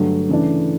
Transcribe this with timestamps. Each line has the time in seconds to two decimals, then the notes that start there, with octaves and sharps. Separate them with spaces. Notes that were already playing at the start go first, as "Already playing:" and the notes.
Already playing: G2 D3 F#3 A3
0.29 C#3 E3 A3 D4